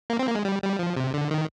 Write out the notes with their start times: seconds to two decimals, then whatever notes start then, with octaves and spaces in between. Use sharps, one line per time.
0.10 A#3
0.19 C4
0.28 A#3
0.35 G#3
0.45 G3
0.62 G3
0.79 F3
0.97 C3
1.14 D3
1.31 D#3